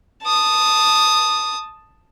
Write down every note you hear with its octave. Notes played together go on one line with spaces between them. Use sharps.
A5 D#6